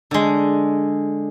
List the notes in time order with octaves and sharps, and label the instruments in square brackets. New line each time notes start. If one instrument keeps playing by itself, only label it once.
[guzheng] D3 G#3